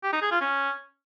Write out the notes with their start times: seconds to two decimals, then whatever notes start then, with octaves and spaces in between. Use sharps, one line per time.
0.03 G4
0.13 D#4
0.22 G#4
0.32 F4
0.41 C#4